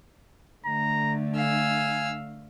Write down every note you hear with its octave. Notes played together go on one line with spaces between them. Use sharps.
D3 A3 A#5
F5 G#5 E6